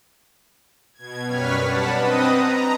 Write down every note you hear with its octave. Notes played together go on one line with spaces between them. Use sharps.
B2 G#6
F#2 G3 B4 C#5 F6 B6
D4 F#5 A5 B5
C4 B4 D#5 D#6
A#5